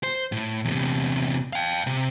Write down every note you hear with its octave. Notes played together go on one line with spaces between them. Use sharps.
C5
A2
E2 C3
F5 G5
C3